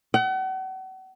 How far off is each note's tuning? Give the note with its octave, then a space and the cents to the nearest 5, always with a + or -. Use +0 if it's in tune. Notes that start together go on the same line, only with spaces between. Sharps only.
F#5 +40